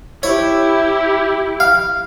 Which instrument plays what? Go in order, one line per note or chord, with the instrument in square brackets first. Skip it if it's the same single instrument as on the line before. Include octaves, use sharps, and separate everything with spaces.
[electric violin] E4 G4 [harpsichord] C#5
[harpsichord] F5